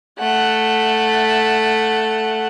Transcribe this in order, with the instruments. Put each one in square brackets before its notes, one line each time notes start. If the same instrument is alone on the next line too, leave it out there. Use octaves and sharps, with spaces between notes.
[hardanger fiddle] A3 F#5